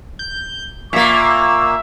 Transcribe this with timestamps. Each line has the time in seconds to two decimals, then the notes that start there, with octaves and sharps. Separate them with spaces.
0.19 G6
0.93 A#2 A#3 E5 C#6 D6